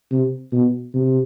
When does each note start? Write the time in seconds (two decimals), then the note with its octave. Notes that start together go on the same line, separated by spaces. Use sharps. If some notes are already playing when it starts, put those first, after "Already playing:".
0.12 C3
0.52 B2
0.94 C3